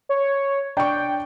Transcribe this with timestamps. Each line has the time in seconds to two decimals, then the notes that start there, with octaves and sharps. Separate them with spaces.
0.09 C#5
0.77 D4 G5 C#6